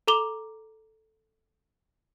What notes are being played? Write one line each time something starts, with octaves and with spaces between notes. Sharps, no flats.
A4 A#5 D6 F7 G7